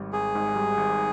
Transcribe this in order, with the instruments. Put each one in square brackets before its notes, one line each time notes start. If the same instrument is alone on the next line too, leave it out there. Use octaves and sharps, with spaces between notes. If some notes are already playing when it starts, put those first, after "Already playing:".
Already playing: [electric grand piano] G#1 G3
[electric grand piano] G#1 [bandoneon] G#4
[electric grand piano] G#2
G3
G#1